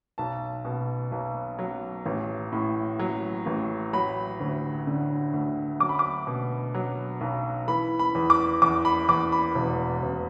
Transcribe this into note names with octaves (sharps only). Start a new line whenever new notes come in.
B1 A5
B2
B1
F#3
A1
A2
F#3
A1
F#3 B5
D2
D3
D2
F#3 D6
B5
D6
B2
F#3
B1
E3 B5
B5
E2
D6
E2 D6
B5
E2 D6
B5
E1
E1